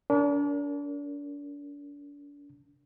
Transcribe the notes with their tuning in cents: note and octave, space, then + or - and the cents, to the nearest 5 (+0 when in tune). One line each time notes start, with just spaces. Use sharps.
D4 -35 A#4 +0